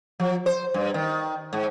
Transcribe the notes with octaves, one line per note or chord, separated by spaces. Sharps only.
F3
C5
G2
D#3
G#2